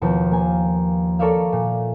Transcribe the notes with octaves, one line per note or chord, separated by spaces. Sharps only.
D#2 B2 F3
A#3 G#5
A4 A#4 C#5 D5 E5 F5
A#2